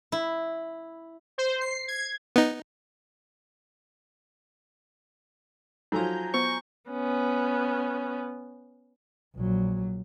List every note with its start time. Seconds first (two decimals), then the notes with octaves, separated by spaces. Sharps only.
0.12 E4
1.38 C5
1.61 C7
1.88 G#6
2.36 B3 D#4
5.92 F3 F#3 D#4 A4 G#5 A#5 G6
6.34 B3 C5 C#6
6.91 B3 C#4
9.36 A#1 F#3